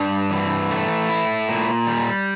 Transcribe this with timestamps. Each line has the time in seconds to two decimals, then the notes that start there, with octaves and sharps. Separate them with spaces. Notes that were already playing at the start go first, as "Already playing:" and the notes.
Already playing: G2 D4
0.31 E3
0.71 A3
1.09 E4
1.48 A#2
1.87 G3